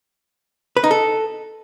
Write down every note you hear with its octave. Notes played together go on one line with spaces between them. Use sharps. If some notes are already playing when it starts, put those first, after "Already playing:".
B4
D#4
A4